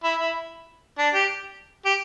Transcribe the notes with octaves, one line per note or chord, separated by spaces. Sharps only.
E4
E4
D4
G4
G4